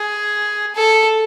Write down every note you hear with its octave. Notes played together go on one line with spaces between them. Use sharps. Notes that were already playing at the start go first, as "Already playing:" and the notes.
Already playing: G#4
A4